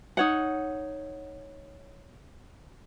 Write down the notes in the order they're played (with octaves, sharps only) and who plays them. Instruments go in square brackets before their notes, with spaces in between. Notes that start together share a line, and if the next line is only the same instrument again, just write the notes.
[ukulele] D#4 C#5 F#5